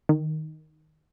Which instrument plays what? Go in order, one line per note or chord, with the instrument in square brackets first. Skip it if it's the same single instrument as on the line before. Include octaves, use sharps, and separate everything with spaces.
[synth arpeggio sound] D#3